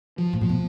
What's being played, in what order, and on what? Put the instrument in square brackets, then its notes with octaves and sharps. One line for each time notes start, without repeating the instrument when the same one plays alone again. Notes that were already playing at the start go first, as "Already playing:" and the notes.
[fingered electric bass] F3
[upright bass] A2
[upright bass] A#2 [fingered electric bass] F3
[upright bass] B2